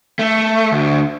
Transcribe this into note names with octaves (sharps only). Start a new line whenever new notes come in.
A3
D2